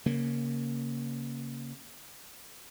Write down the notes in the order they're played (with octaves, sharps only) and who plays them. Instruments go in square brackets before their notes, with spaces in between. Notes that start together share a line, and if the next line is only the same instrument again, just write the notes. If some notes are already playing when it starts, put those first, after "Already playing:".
[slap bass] C#3 A#3